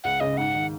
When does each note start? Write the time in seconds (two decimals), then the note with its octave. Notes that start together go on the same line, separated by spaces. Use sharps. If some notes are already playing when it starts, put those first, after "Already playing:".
0.04 C#2 F#5
0.20 C#3 D#5
0.37 G#2 F#5
0.54 D#3